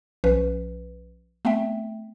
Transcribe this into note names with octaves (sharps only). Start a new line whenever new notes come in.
B1 F3 C#4 B4
A3 B3 C4 E5 G5